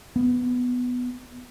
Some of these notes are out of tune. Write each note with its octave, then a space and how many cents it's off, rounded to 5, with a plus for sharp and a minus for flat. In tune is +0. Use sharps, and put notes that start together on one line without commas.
B3 +5